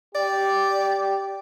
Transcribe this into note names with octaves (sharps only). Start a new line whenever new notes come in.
G4 D5